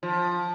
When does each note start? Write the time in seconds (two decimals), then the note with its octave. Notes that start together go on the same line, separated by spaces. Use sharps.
0.03 F3